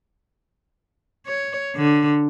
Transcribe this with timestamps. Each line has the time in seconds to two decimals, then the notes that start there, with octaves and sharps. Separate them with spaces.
1.27 C#5
1.75 D3